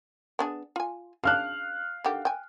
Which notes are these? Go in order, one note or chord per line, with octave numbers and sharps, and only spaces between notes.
B3 D4 G#4
F4 G#5
C#3 D4 F5 F6 F#6
D3 D#3 G4
G5 G#5